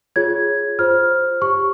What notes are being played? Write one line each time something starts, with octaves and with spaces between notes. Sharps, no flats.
F4 G#4 C#5 G#6
F4 C5 F6
G4 C#5 C#6